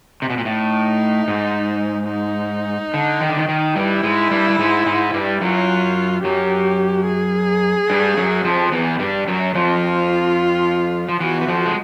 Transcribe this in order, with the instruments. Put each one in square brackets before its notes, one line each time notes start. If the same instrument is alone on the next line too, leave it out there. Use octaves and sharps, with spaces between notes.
[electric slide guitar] C3
B2
A#2
[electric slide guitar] A2 [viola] D#4
[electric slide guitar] G#2
[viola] D#4
[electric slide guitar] D3
D#3
D3
D#3
D#3
[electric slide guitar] G2 G3 [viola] E4
[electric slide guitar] G#2 G#3
G2 G3
G3
G#2 G#3
G#2 G#3
G2 G3
[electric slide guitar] F#2 F#3 [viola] F4
[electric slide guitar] F#2 F#3 [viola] G4
[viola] G#4
[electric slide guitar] G2 G3
F#2 F#3
F2 F3
E2 E3
G2 G3
F#2 F#3
[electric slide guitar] F2 F3 [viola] F4
[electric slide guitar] F3
[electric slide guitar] E2 E3 [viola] F#4
[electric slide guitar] E3
F2 F3
G#3